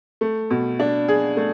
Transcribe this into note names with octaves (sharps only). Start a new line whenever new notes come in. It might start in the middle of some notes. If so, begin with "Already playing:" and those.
A3
B2
D4
G#4
A3